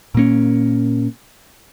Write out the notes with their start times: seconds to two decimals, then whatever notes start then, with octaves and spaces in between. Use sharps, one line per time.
0.15 A#2 A#3 C#4